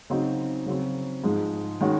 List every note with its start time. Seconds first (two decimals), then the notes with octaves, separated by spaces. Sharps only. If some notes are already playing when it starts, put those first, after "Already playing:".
0.10 C#3 F#3 C4 D#4 F#4
0.66 C#3 F#3 C4
1.24 G#2 F3 G#3
1.81 D#3 G#3 C#4 F#4